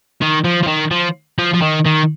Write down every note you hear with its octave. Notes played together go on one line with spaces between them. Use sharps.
D#3
F3
F3
D#3
F3
F3
F3
D#3
D#3